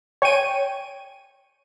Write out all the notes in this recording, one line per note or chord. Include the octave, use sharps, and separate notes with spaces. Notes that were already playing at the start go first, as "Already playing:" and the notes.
C#5 G5 G#5 C#6 D#7